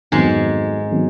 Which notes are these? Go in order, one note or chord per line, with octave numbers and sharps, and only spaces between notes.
F2 G#2 D#3 F#3 G#3 B3
D#3 F#3 B3